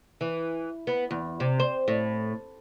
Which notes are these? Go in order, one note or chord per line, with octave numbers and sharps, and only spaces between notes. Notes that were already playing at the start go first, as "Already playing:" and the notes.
E3
B3
E2
C3
C5
A2